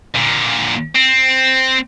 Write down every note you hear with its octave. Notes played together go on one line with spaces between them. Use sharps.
A#2 D3
C4